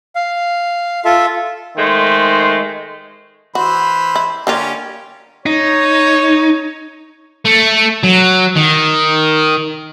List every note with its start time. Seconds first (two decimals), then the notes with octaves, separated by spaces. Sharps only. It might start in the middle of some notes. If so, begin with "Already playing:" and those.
0.15 F5
1.05 F4 A4 E5
1.76 D#3 G#3 A3 C5
3.55 E3 F#4 C5 B5
4.16 E4
4.47 D3 A#3 C#4 F4 G4
5.46 D#4 C#5
7.45 A3
8.04 F#3
8.56 D#3